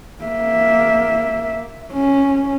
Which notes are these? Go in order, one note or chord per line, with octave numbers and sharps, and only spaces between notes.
A#3 E5
C#4